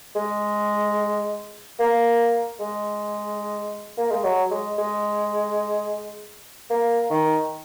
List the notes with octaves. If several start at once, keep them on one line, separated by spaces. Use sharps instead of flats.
G#3
A#3
G#3
A#3
G#3
F#3
G#3
G#3
A#3
D#3